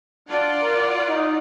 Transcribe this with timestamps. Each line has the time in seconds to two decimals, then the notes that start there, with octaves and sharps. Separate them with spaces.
0.29 D4 F4 D5 F#5
0.61 A#4
1.08 D#4